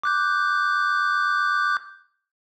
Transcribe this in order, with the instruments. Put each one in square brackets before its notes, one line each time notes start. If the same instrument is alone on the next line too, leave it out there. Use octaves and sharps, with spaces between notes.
[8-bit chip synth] D6 F#6 G6